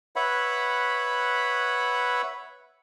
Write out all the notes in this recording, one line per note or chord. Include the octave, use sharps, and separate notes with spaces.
B4 C#5 E5 F#5 B5